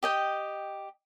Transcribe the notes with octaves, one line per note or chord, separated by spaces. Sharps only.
G4 D#5 G5